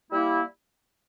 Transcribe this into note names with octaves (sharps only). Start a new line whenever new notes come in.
G3 A#3 E4